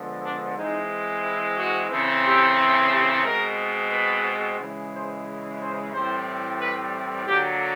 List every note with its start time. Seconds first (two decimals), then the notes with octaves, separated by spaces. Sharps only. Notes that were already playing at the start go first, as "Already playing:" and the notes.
Already playing: D3 F3 G#3 B3
0.24 D4
0.57 E3 G#3 C4 D#4
1.24 E4
1.58 F#4
1.91 C#3 E3 A3 C4
2.24 G4
2.92 G4
3.25 B2 G#3 C4 A#4
3.92 B4
4.59 C#3 E3 G#3
4.93 C5
5.60 C5
5.93 A2 E3 G3 C4 C5
6.60 B4
7.27 D3 F#3 A#3 G4